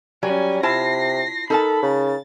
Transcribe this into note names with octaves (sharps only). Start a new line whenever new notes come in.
F#3 G3 C#4 G#5
C3 E4 F4 A5 A#6 C7
D#4 A4 A#4 A5 B5
C#3 A6